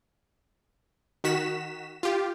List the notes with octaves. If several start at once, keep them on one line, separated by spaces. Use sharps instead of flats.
D#3 F#4 B6 E7
F4 G4